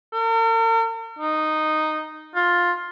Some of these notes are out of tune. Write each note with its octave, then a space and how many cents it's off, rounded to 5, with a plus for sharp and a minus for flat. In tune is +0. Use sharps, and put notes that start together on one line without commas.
A#4 -45
D#4 -5
F4 +10